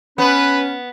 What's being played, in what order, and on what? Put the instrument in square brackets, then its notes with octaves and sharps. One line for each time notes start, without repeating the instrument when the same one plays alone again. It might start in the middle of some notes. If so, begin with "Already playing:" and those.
[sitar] B3 [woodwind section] C#4 [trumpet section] B4